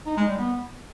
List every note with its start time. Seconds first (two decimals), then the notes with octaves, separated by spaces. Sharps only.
0.06 D#4
0.17 G#3
0.28 G3
0.39 B3